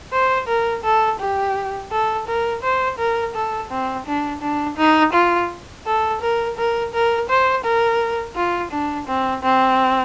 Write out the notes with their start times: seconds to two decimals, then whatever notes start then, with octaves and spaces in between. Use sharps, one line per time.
0.13 C5
0.48 A#4
0.84 A4
1.20 G4
1.91 A4
2.28 A#4
2.63 C5
2.98 A#4
3.35 A4
3.71 C4
4.06 D4
4.42 D4
4.78 D#4
5.13 F4
5.86 A4
6.22 A#4
6.57 A#4
6.94 A#4
7.29 C5
7.64 A#4
8.36 F4
8.72 D4
9.08 C4
9.43 C4